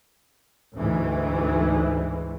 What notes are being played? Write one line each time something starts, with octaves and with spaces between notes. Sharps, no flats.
D2 G#2 E3